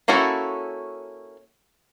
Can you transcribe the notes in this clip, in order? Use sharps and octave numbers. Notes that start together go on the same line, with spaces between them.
A#3 C#4 E4 F#4 A4